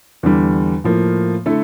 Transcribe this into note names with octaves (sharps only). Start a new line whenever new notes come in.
E2 D3 G3
A2 F3 A#3
D3 A3 E4 A4